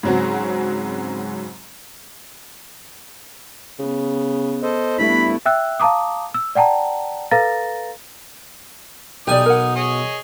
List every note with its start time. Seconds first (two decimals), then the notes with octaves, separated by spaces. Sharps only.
0.03 G#2 C#3 F#3 C4 F#4
3.79 C#3 B3
4.63 A4 C5 D#5
4.99 G2 A3 B3 E4 B5
5.45 E5 G5 E6 F#6
5.80 F5 A5 A#5 D6 D#6
6.34 E6
6.55 D5 F#5 G5 A5 A#5
7.31 A4 B4 F5 A#5 A6 A#6
9.27 B1 D#4 G4 D5 G#5 D#6
9.46 A#4 F#5
9.76 G#4 C#5 D#5